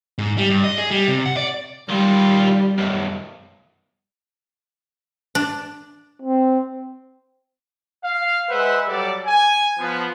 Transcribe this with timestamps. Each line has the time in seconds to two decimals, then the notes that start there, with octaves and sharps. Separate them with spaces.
0.18 G#2
0.38 G3
0.50 G2
0.64 D#5
0.78 G#4
0.91 G3
1.08 C3
1.25 F#5
1.37 D5
1.89 D#3 G3 F4
2.78 B1 F#2
5.35 D4
6.22 C4
8.04 F5
8.50 G#3 B4 C5 E5 F#5
8.88 F#3 G3 A4 D5
9.26 G#5
9.79 F3 B3